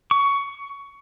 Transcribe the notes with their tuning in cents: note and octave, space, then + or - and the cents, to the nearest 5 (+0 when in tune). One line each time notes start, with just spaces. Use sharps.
C#6 +15